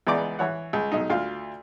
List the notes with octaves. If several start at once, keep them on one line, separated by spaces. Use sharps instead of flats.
C#2 E3 B3 D5 A#5 D6
E3 C#5 F#5
C#2
B1 D#4
D2 F4 F5